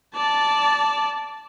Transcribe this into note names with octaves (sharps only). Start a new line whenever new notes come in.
D5 A5